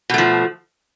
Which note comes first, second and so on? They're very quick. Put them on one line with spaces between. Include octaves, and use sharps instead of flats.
B2 A3 F3